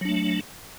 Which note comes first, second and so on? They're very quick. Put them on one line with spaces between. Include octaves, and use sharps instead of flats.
F#3 D4 A3